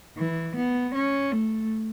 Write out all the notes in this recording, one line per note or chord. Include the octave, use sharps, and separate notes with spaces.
E3
B3
C#4
A3